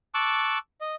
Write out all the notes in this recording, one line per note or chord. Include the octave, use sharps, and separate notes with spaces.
A5 C#6 D6 E6 F#6
D#5